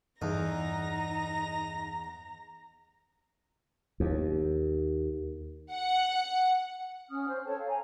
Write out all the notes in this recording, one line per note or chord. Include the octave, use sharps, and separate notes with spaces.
E2 G2 D#4 A#5
D#2
F#5
C#4 D#6 F6
C5
A4 C#5 G5 A5
F5
G#5 A#5